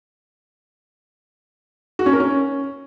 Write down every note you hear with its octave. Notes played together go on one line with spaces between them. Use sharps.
F#4
C#4
A#4
C#4